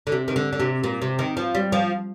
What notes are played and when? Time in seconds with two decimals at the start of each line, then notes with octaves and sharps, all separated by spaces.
0.07 D3
0.12 C3
0.28 D#3
0.36 D3
0.53 D3
0.60 C3
0.83 A#2
1.02 C3
1.19 D#3
1.37 F3
1.55 G3
1.72 F3